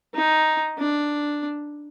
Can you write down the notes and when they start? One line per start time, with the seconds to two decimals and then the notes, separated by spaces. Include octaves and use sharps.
0.15 D#4
0.78 D4